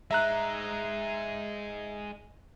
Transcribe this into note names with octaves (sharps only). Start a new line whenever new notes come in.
G#3 D#4 E5 A#5 F#6